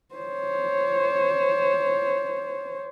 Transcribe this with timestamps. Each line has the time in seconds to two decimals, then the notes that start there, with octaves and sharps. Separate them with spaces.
0.15 C5 C#5